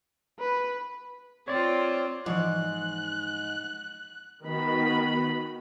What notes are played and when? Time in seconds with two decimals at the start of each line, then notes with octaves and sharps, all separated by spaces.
0.40 B4
1.48 C4 F4 C#5 D5
2.26 G#2 E3 F3 F#6
4.45 D#3 B3 F#4 B5